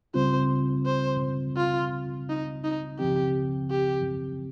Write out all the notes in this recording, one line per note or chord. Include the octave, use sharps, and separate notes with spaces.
C#2 C#3 G3 C4 F4 C5
C5
F4
D#4
D#4
C#2 C#3 F3 C4 G4
G4